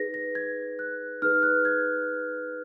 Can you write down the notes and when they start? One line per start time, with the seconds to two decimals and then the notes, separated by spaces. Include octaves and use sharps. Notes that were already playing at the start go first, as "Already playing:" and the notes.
Already playing: D#4 G#4 B4 A#6
0.14 A#6
0.35 G#6
0.79 F#6
1.22 D#4 G#4 B4 F6
1.43 F#6
1.65 G#6